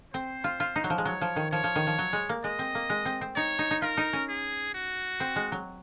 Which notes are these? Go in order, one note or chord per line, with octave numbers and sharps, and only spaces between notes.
C4 C5
F4
F4
D#4
F#3
F3
G#3
F#3 C#5
F3
D#3
F3 C#5
F3
D#3
F3
F#3
G#3
A#3
G#3 D#5
C4
A#3
G#3
C4
C4
D#4 C#5
D#4
D#4
F4 A#4
D#4
C#4
G#4
F#4
C4
G#3
F#3